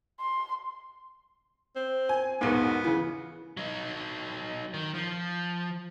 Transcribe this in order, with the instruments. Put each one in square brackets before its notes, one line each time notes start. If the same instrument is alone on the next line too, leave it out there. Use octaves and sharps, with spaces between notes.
[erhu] C6
[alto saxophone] C4
[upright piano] G#5
[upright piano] E1 B1 G#2 [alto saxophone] B3
[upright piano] C#3 E3
[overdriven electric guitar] F#3 D#4
D#3
F3